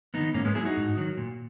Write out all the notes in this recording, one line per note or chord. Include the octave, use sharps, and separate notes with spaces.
D#3 F#3 B3 D#4
G#2 A#3 C#4
G#3 B3
F#3 E4 G#4
D#4 F#4
G#2
D#3 F#3
A#2